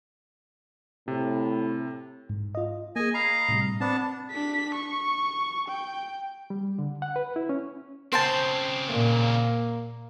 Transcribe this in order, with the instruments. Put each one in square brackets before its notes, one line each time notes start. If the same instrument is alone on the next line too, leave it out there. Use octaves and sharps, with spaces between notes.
[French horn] A2 [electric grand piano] C3
[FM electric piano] G#2
F4 D#5
[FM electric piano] A#3 G#4 [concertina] D#5 G#5
[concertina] D#5 F5 A#5 [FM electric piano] B5
[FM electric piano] A2 C3 G3
[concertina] B3 D4 A5 [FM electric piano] C4
[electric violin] D4 B6
C#6
G5
[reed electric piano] G3
D3
F#5
B4
E4
C#4
[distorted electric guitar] C#3 C4 [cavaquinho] C5 G5 A5
[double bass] A#2 [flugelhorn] A#3